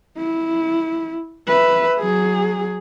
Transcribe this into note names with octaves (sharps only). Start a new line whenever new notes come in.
E4
B4 E5
F#3 G#4